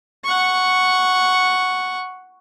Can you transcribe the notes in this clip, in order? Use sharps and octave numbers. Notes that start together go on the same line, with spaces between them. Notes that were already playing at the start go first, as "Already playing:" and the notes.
F#5 C#6